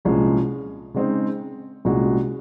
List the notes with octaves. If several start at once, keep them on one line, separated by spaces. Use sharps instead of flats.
C2 A#2 F3 G#3 C#4
C#3 G#3 C4 D#4
C2 A#2 G#3 C#4 F#4